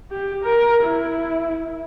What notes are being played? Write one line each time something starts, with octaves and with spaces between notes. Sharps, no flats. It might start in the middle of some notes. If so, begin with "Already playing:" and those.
G4
A#4
E4